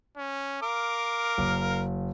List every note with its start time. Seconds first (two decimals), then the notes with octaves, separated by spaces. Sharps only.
0.17 C#4
0.62 A#4 F5 D6
1.38 F#1